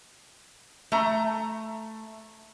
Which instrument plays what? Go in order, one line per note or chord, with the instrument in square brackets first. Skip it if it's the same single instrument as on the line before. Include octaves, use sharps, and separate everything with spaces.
[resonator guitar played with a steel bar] A3 A#5